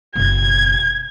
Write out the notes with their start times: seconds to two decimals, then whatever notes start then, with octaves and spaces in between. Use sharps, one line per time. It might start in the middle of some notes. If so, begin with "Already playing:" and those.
0.16 F#1 B2 G#6